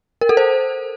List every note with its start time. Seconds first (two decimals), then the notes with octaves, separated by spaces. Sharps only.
0.21 A#4
0.29 A4
0.37 C5